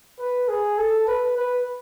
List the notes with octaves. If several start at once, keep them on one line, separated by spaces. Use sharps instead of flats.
B4
G#4
A4
B4
B4